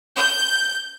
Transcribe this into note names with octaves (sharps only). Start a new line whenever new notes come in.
G6